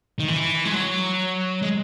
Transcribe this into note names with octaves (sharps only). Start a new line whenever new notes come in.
D#3
E3
G#3
F#3
G#3